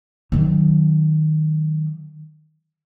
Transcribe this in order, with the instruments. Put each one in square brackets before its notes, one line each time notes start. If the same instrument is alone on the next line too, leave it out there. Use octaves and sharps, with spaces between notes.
[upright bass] D#3 F#3